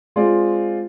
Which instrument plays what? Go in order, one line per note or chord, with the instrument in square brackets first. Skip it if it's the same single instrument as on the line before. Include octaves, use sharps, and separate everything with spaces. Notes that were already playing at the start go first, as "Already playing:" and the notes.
[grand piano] G#3 C4 F4 G#4 D5